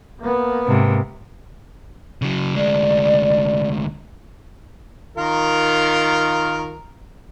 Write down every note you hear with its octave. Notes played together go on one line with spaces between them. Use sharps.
A#3 B3
G#2 C3
C#3 F#3
D2 G#3 D5
D#3 F4 A#4